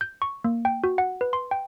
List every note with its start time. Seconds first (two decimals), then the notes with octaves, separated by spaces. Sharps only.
0.01 G6
0.22 C#6
0.44 A#3
0.65 G5
0.84 F#4
0.98 F#5
1.21 B4
1.33 C6
1.51 G5